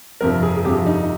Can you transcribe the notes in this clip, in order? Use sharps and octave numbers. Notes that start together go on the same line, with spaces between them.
G1 F2 C3 F3 A#4
G#4
G#4
G1 F2 C3 F3 G4
D#4